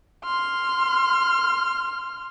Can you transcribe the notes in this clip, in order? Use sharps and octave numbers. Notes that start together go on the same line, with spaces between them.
C6 F6